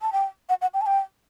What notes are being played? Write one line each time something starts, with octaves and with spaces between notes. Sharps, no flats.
A5
G5
F#5
F#5
G5
A5
G5